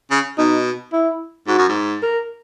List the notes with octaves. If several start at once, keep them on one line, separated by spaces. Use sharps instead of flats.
C#3
B2 D#4
E4
G#2 F#4
F#2
G#2
A#4